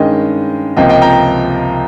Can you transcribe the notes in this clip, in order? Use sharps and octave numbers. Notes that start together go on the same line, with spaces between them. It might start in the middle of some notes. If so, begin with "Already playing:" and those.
Already playing: G2 D#3 G#3 C#4 D#5 G5
C#2 C3 F3 A#3 D#5 G5
D#5 G5
G5 A#5